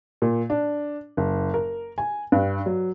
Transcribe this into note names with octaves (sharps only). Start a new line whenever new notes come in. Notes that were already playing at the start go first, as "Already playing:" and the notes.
A#2
D4
F#1
A#4
G#5
G2
F#3